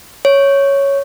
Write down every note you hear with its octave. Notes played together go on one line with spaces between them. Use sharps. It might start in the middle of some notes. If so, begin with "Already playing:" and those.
C#5